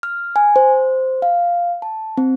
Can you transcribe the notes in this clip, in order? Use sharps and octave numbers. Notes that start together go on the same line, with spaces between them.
F6
G#5
C5
F5
A5
C4